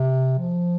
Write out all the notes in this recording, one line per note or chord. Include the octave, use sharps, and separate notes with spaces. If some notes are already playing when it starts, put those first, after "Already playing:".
Already playing: C3
F3